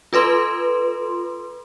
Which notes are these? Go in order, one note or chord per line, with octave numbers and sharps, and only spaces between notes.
F4 A4 B4 C6